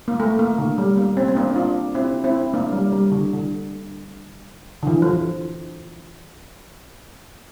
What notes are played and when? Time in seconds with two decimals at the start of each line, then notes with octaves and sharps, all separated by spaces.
0.08 A#3
0.20 A3
0.39 A#3
0.58 D3
0.78 G3
0.98 A#3
1.17 C4
1.28 C4
1.36 A#3 D4
1.56 D4 F4
1.95 C4 E4
2.24 C4 E4
2.54 A#3 D4
2.73 G3
2.93 G3
3.12 D3
3.33 D3
4.83 D3
4.87 E3
5.02 F3